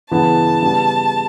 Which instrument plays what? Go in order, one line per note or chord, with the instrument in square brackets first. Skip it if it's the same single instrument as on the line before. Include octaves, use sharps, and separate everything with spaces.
[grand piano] C#3 E3 B3 [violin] A5
[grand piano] C#3 G3 B3